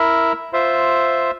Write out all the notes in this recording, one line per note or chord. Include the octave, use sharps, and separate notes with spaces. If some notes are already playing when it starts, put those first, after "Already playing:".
Already playing: E4 A#4 E5
F4 C5 E5